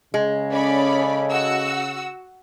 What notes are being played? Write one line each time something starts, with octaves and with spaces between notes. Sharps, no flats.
C#3 G#3
C#4 G#4 A4 D5 D#5 B5
F#4 F#5 E6